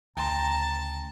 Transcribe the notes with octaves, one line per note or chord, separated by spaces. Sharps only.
D2 C#3 G5 A5 A#5 C6